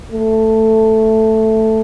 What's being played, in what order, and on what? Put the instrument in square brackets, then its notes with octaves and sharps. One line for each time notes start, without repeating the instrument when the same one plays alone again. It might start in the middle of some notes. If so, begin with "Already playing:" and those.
[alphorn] A3